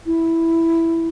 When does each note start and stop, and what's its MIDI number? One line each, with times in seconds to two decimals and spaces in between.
0.06 1.09 64